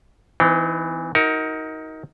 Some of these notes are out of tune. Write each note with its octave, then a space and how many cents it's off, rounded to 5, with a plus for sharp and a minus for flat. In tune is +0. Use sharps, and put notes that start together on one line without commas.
E3 +0 C4 -40 D#4 +5
D#4 +25 F#4 +0 A#4 +0